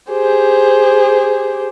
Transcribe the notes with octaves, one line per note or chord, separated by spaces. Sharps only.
G4 G#4 C5